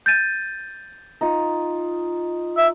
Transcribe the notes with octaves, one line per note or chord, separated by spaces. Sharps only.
G6 A6 D#7
D#4 F4
E5